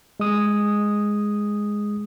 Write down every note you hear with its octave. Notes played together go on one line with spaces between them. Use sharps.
G#3 D#6